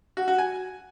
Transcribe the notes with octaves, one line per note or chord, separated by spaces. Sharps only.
F#4
F#4
G#5